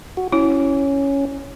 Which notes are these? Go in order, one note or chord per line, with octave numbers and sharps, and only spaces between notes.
F#4
C#4 E4